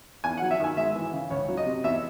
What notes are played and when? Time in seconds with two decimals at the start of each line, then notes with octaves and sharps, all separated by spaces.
0.24 E2 G#5
0.37 F#5
0.42 F#3
0.51 E5
0.60 D#3 G#5
0.77 G#3 E5
0.96 E3
1.13 C#3
1.30 C#2 C#5
1.48 F#3
1.57 D#5
1.66 C3
1.84 E2 E5